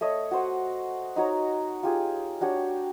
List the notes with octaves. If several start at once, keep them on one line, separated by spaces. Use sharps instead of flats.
A3 C#5 D#5
F#4 C5 F#5
D#4 F#4 C#5 A#5
F4 G4 G#4
D4 F#4 G4 C#5